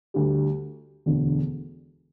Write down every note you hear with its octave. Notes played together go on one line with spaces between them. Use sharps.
D2 D3 G3
E1 D2 D3